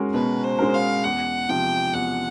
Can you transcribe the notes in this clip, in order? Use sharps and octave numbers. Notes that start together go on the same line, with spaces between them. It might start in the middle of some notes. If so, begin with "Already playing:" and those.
Already playing: G#3 C#4 F#4 A#4
B2 B4
C5
G#3 C#4 F#4 A#4
F5
E2 F#5
C3 F3 G5
E2 F#5